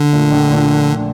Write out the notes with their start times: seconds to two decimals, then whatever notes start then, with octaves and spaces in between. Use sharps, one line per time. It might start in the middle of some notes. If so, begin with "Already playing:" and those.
Already playing: D3
0.13 A#2 A3
0.32 A#1
0.50 A#2 A3